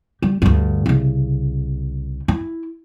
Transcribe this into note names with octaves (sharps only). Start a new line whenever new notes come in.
G3
D2 G2
C2 C#3
E4